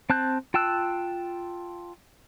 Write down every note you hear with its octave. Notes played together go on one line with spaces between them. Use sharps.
C4 A5 F#6 G6
F4 G5 A5 E6 F#6